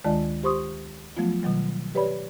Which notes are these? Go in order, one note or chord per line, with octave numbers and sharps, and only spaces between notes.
D2 D#3 G#3 F4 D5 A5
G4 C5 C6 C#6 D#6
F3 F#3 A3 B3 F4
B2 D#3 F#3 G3
G4 B4 C#5 D5 B5